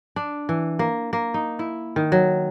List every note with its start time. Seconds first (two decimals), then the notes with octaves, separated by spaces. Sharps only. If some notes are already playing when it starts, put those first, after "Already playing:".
0.16 D4
0.49 E3
0.79 A#3
1.13 A#3
1.34 D#4
1.59 E4
1.96 D#3
2.12 F#3